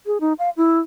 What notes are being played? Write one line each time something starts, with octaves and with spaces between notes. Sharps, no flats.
G#4
D#4
F5
E4